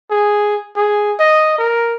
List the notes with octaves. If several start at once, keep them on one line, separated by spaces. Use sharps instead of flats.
G#4
G#4
D#5
A#4